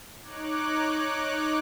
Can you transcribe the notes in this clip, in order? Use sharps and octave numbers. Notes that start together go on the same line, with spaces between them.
D#4 C#5 D6 F#6